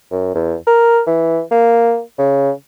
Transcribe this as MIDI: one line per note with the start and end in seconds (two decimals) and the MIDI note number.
0.11 0.34 42
0.35 0.56 40
0.67 1.01 70
1.07 1.41 52
1.51 2.00 58
2.19 2.51 49